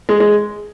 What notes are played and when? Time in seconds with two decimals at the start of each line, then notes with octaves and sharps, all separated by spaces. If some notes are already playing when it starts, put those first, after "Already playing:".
0.09 G#3
0.20 G#3